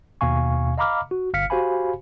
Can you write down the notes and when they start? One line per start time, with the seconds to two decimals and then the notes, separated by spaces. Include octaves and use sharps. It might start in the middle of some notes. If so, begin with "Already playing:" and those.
0.21 D#2 B2 F5 G#5 C#6
0.78 D#5 F5 A#5 B5 D6 F6
1.11 F#4
1.34 G1 F5 F6 B6 C#7
1.50 F#4 G4 C5 F5 G#5 B5